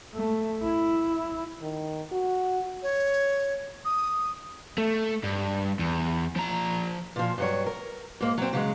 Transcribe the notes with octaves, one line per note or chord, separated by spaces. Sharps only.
A3
E4
D#3
F#4
C#5
D#6
A3
G2
E2
F3 A#5
A#2 F3
G2 F#3 C#5
A#4
G#2 A#3
F#3 C4
C#3 F#3 G#3